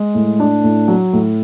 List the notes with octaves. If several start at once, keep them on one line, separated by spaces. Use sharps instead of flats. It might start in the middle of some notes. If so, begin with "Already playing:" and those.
Already playing: G#3
A2
D4
A2
F#3
A2